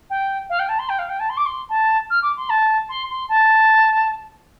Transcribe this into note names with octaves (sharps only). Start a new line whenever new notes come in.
G5
F5
G5
A5
C6
G5
F5
G5
A5
C6
D6
C6
A5
F6
D6
C6
A5
C6
C6
A5